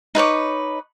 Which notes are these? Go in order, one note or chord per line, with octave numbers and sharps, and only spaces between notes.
D#4 B4 C#5 D6